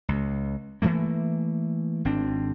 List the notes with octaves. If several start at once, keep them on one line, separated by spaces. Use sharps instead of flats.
C#2
E3 F3 A3 A#3
G#1 C4 D4